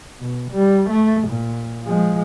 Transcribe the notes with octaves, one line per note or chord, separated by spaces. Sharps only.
B2
G3
A3
A#2
F3 G#3